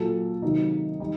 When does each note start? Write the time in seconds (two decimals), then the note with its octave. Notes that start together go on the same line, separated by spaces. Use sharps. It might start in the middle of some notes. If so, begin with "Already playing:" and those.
Already playing: A#2 F#3 A4
0.42 C3 D#3 F#3 D#4
1.00 G3 D#4